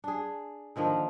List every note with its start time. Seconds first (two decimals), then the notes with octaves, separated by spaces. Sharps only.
0.04 D4 G#4
0.76 D3 D#3 F3 A#3